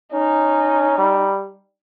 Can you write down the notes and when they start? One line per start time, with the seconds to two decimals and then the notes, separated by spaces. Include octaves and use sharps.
0.13 C#4 D#4
0.98 G3